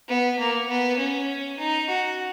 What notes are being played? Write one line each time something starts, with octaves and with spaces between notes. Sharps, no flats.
B3
A#3
B3
C#4
D#4
F#4